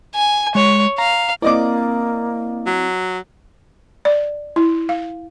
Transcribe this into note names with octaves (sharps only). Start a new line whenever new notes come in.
G#5
G#3 C#5
F5 A#5
A#3 C4 E4 D5 D#5 D6
F#3
D5
E4
F5